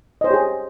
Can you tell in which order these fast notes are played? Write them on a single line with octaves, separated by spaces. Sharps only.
D#5 C5 C#5 G4 G#4